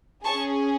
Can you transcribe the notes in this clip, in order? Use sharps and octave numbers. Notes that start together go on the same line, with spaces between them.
C#4 G#4 A5 C#6